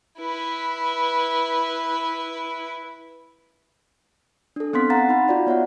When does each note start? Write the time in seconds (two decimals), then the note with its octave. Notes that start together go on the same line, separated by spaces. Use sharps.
0.19 E4 B4
4.56 D4 A4
4.73 B3 C4 C6 B6
4.90 F5 F#5 A#5 A6 B6
5.09 D#4 A#5 B5
5.28 F4 F#4 D5 F5
5.47 B3 C#5 E5 F#5